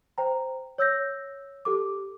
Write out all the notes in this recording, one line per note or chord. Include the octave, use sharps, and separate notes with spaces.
C5 G5 A#5
C#5 E6 G6 A#6
G4 A4 D6